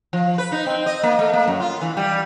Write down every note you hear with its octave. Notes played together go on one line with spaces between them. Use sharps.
F3
B4
D#4
C4
D#5
A#3
A3
A#3
F#2
F4
E3
G3